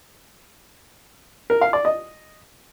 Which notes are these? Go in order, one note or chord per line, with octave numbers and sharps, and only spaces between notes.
A#4
F5
D5
D#5